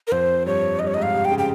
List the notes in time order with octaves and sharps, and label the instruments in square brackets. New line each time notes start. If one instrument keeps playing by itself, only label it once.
[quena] A#4
[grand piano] F2 [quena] C5
[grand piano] G2 [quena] C#5
[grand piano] G2 [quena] D#5
[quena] C#5
[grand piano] G#2 [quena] D#5
[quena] F5
[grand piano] C3
[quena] G5
[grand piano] C#3
[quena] G5